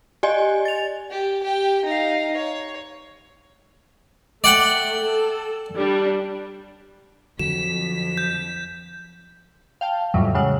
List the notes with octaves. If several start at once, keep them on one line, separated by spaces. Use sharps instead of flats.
G4 D5 D#5 G#5
A6 F7
G4
G4 G5
D#4 F5
C#5
A3 D5 F#5 G5
A4
G3 D4
F2 D3 F#3 B6 E7
G6
F5 G5 A5
F2 A2 C#3 E3 F#3 G3
C#3 F#3 G#3 F#5